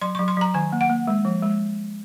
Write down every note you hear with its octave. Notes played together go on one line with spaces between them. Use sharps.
F#3 C6
F#3 C#6
C6
F#3 A#5
D#3 G#5
A#3
F#5
A#3
G#3
F3
G#3